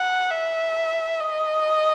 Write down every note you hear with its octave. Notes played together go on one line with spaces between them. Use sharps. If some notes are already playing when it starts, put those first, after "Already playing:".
Already playing: F#5
E5
D#5